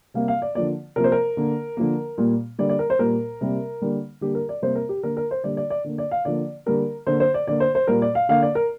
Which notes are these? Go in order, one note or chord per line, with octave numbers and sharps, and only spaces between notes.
C3 G3 A#3 F5
F5
D5
D3 F3 A#3 D5
C3 F3 A#3 A#4
C5
A#4
D3 A#3
D3 F3 A#3
A#2 G3 A#3
D3 G3 A#3 D5
D5
A#4
C5
A#2 G3 A#3 A#4
C3 G3 A#3
D3 G3 A#3
D3 G3 A#3 G4
A#4
D5
C3 G3 A#3 C5
A#4
G4
D3 A#3 A#4
A#4
C5
D3 G3 A#3 D5
D5
D5
D3 A#3
D5
F5
D3 F3 A#3 D5
D3 G3 A#3 A#4
D3 A#3 C5
C5
D5
D3 A#3 D5
C5
C5
A#2 G3 A#3 A#4
D5
F5
D3 A#3 F5
D5
A#4